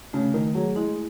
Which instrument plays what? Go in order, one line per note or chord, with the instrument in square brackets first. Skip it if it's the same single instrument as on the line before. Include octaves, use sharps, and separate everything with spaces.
[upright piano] C#3 [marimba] A3
[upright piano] D#3 [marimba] A3
[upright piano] F#3 [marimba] G#4
[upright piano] G#3 [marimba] E4